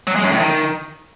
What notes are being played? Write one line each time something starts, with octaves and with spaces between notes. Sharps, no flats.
F#3
G#3
F#2
A2
D#3